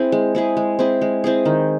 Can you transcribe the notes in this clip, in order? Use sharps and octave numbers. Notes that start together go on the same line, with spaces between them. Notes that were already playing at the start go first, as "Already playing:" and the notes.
Already playing: C4 E4 G#4
G#3
C4 E4 G#4
G#3
C4 E4 G#4
G#3
C4 E4 G#4
D#3